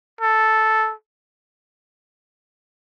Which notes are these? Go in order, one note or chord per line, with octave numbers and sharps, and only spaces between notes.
A4